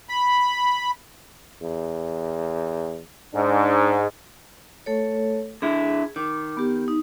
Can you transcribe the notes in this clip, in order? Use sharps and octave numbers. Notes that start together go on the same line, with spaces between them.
B5
E2
G#2 D4
A3 A4 C#5
D3 E4 G#4
D#3 D6
B3 G4
D#4